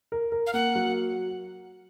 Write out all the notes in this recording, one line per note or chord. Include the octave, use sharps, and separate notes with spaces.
A#4
A#4
F5
A#3 F#5
F#3